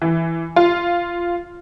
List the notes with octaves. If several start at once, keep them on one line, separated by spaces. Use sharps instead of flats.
E3
F4